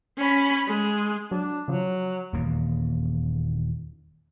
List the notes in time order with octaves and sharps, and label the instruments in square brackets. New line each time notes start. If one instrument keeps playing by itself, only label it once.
[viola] C#4 B5
G#3
[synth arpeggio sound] F#3 [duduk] D4
[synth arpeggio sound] C#3 F3 [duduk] F#3
[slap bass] D#1 E2 A#3